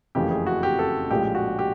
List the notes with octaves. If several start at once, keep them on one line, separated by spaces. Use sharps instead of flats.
F#1 F2 C#3 E3 A3 G4
G#4
F#4
G4
A4
A#1 A2 F3 G#3 G4
F#4
G4